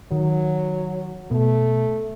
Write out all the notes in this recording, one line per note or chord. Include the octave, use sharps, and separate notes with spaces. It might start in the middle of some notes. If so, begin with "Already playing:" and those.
D#3 F#3
B2 A3